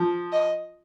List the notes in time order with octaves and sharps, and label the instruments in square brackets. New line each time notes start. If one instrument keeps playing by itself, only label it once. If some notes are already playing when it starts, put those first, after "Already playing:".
Already playing: [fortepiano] F3
[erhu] D#5